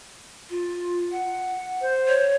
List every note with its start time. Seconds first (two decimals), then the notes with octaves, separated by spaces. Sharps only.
0.50 F4
1.12 F#5
1.81 C5
2.08 C#5